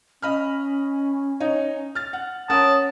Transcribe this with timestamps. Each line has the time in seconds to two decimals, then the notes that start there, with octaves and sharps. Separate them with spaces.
0.22 C#4 D#5 B5 F6
1.40 D#4 C#5 D#5
1.95 F6 A6
2.13 F#5
2.50 C#4 A#4 C#5 F#5 A5 D#6